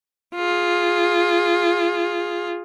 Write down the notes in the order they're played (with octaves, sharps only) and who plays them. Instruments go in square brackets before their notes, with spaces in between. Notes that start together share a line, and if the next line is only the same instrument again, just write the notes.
[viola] F4 G#4